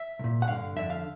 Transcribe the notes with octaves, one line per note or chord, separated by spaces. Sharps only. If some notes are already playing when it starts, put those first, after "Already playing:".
Already playing: E5
C2
A#2
F#5
G2 D3 F5
F2 D3 E5
F5